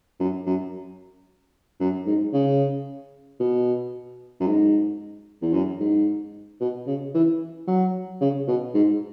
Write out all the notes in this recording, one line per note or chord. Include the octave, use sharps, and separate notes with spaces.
F#2
F#2
F#2
G#2
C#3
B2
F#2
G#2
E2
F#2
G#2
B2
C#3
E3
F#3
C#3
B2
G#2